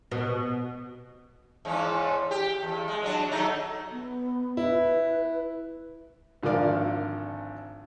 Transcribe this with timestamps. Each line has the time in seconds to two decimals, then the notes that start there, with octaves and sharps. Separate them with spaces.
0.12 B2
1.65 E2 G#2 C#4
2.31 G4
2.62 E2
2.88 G#3
3.03 F#3 D4
3.32 F#3 A3 D#4
3.91 B3
4.57 E4 B4
6.43 G#1 D3 F3 A#4 D5 F5